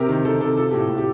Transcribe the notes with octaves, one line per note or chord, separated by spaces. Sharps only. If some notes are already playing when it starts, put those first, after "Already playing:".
Already playing: C3 G4 A#4
D#3
D#3 A4
C3 A4
F3 A4
A2 G4
A2
G4